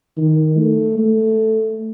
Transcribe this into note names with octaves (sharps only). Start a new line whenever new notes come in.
D#3
A3
A3